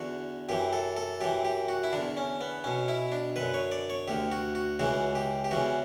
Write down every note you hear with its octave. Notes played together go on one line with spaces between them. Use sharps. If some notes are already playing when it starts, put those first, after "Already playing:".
Already playing: E2 D3 F#4
F#2 E3 G4
A4
A4
F#2 E3 G4
G4
F#4
E4
E2 D3 D4
C#4
B3
B1 B2 C#4
E4
D4
F#2 D3 B4
C#5
D5
C#5
D2 D3 G4
F#4
F#4
C#2 C#3 E3 F#4
G4
G4
E2 C#3 E3 F#4